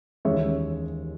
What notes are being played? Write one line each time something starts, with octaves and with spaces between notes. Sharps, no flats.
D#2 C#3 E3 G#3 C#5 E5